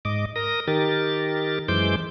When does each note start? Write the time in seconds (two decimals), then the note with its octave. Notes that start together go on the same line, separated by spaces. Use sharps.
0.05 G#2 D#5 D6
0.36 A#4 D#6 A#6
0.68 D#3 G4 A#4 A6
1.68 F#2 E3 G#3 C5 D6 G6